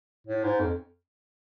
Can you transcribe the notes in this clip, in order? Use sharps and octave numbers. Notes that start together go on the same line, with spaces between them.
A2
G#2
F2